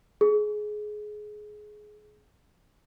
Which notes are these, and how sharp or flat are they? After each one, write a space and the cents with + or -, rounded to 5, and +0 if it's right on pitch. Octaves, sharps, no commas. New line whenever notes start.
G#4 +20